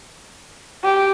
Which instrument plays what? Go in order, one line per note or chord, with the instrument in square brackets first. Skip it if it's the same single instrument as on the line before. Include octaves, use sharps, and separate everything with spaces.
[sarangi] G4